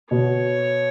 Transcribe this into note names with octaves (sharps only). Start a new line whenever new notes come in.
B2 C#5